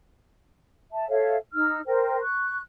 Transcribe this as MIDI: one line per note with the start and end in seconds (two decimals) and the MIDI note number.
0.92 1.08 76
0.92 1.08 81
1.09 1.36 69
1.09 1.36 73
1.09 1.36 76
1.09 1.36 77
1.53 1.79 63
1.53 1.79 88
1.53 1.79 89
1.86 2.20 70
1.86 2.20 72
1.86 2.20 79
2.21 2.60 85
2.21 2.60 90